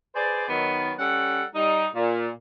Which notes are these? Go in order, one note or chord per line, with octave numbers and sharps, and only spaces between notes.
G#4 B4 C5 D5
D#3 F#3 B3
G3 C#4 A4 F#5
G3 D#4
A#2